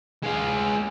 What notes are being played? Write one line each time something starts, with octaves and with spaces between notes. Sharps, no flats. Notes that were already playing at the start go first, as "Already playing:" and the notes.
G#3 F5